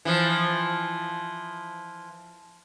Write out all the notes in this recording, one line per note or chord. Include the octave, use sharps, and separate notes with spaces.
E3 F3